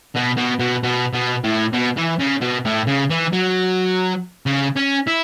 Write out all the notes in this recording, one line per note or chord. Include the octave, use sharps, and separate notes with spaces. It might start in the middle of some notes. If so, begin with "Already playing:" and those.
B2
B2
B2
B2
B2
A2
B2
E3
C#3
B2
A2
C#3
E3
F#3
C#3
C#4
E4